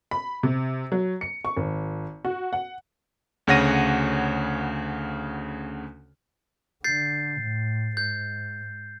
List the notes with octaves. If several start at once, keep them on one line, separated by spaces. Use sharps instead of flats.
B5
C3
F#3
C#7
C#6
G#1
F#4
F#5
D2 C#3 C#5 F#5 A#6 D#7
D3 G6 A6 C7
A2
G#2 G6